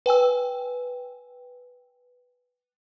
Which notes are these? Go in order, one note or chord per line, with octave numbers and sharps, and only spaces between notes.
B4 G5 G#5 E6